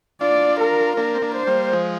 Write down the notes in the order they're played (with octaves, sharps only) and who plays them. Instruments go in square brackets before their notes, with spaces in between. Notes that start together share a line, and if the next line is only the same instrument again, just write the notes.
[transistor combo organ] D4 F4 [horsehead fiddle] D5
[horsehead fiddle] A#4
[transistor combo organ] A#3 D4 [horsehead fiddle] A#4
[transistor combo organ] C4
A#3 D4
[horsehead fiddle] C5
[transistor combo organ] G3 A#3
F3 G#3